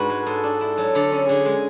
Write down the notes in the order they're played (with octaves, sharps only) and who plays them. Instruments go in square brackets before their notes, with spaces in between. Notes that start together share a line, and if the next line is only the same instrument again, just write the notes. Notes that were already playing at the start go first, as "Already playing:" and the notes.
Already playing: [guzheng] G#2 D4 F#4 [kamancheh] B4
[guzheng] G#3
[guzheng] G#2 [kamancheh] A4
[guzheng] D4
E4
F#3
D3
C#4
[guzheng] D3 [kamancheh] G#4
[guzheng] G#3